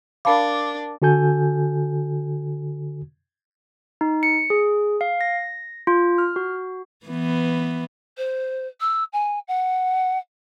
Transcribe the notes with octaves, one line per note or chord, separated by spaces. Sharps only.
D4 A#4 F5 A5 B5 D6
D3 F#4 A4 G#5 G6
D#4
C#7
G#4
F5
A#6
F4
F6
F#4
E3 B3
C5
E6
G#5
F#5